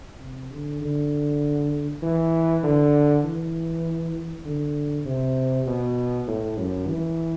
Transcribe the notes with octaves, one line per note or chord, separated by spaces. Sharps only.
C3
D3
D3
E3
D3
E3
D3
C3
B2
A2
F#2
E3